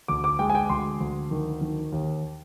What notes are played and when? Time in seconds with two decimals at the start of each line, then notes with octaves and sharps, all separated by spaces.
0.08 D2 D6
0.24 D6
0.39 G#3 G5
0.50 G#5
0.55 G5
0.70 D2 C6
1.01 D2
1.31 D#3
1.61 D#3
1.92 D#2